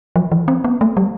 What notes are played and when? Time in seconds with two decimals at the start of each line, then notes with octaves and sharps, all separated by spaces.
0.16 F3
0.32 E3
0.48 C4
0.64 B3
0.81 A3
0.97 G3